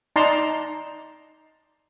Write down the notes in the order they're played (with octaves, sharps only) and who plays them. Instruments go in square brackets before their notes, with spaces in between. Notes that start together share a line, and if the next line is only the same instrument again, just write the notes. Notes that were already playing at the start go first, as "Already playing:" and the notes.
[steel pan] D#4 D5 A5 A#5 C6